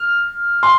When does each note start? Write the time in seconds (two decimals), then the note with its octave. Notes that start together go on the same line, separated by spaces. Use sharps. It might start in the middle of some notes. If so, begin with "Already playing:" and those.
Already playing: F6
0.63 C6